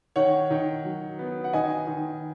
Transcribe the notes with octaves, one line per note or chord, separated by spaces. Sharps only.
D#3 C#5 F#5
D#3
F#3
B3
F#5
D#3 D#5 G#5
D#3